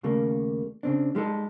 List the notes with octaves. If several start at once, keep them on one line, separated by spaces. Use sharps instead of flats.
D#2 C#3 G3 A3 A#3
C#3 C4 D4
G3 G#3 D#4 A4